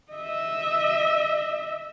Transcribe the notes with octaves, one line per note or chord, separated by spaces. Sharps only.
D#5 E5